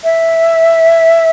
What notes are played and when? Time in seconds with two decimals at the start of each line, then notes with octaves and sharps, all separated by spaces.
0.04 E5